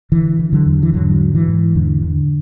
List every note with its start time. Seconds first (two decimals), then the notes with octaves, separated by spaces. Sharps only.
0.12 D3 E3
0.39 D3
0.53 D3 F#3
0.66 E2
0.83 E3
0.94 G#2 D3 F#3
1.21 G#2
1.35 E3
1.48 G#2
1.75 E2 D3
2.03 D3